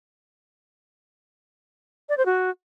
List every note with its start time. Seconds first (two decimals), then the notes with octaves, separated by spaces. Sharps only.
2.09 D5
2.17 C5
2.26 F#4